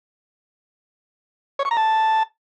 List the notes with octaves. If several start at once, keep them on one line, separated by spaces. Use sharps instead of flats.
C#5
C#6
A#5
A5